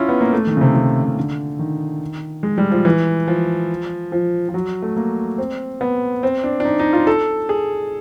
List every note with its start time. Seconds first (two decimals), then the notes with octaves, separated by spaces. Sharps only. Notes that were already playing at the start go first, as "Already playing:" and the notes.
Already playing: C#4 E4 F4
0.09 B3
0.21 A#3
0.33 A3
0.47 D#3
0.57 C#3
0.61 C3
0.75 C#3
1.03 C3
1.17 D3
1.59 D#3
2.43 G#3
2.58 G3
2.71 F3
2.85 E3
3.28 F3
4.12 F3
4.49 F3
4.54 F#3
4.82 A3
4.97 A#3
5.38 C4
5.81 B3
6.23 C4
6.44 D4
6.60 D4
6.65 D#4
6.79 D#4
6.93 F4
7.07 A4
7.49 G#4